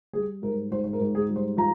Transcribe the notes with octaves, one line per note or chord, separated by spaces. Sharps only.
G3 G#4
G#2 A#4
G#2 C5
C5
A#4
G#2
G#4
G3
C5
F3 A#5